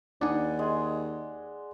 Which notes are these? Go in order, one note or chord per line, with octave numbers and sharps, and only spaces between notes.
D#2 D4 D#4 D5 F#5 G#5
G#3